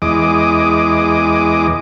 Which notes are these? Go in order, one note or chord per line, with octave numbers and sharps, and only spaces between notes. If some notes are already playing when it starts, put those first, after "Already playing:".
E2 G#3 D#5 D6